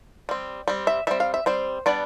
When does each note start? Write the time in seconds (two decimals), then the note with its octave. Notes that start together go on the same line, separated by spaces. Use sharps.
0.29 G3 C4
0.68 G3 C4
0.87 E5
1.07 G3 C4 E5
1.20 F5
1.34 E5
1.46 G3 C4 C5
1.86 G3 B3 D4 D5